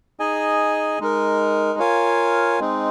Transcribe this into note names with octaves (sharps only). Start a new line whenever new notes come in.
D#4 G#4 D#5 G#5
G#3 D#4 A#4
F4 A#4 C#5 F5 G#5
G#3 C4 D#4